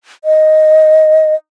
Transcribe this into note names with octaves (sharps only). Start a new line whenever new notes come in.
D#5